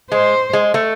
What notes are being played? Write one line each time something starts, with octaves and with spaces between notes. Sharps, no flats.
G#3 C5
G#3
A3